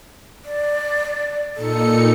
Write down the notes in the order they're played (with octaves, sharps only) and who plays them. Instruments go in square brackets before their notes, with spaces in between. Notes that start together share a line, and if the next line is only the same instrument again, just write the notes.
[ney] D5
[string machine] A#2 D#4 C#7 [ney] A4